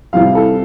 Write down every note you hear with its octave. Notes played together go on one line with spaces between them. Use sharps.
C2 C3 E3 G3 F5
A4